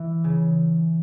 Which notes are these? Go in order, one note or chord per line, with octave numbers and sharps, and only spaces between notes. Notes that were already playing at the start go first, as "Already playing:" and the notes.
Already playing: E3
C#3